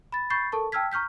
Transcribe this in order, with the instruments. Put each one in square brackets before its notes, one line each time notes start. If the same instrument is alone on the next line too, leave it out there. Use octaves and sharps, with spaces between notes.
[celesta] B5 A6
B5 C#6 G6 A6 C7
A4 A#4 A5 C#6
G5 A5 E6 F6 G#6 B6
A#5 C#6 F6 G6 B6